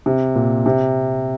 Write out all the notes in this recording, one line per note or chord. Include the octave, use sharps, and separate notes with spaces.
C3
A#2
C3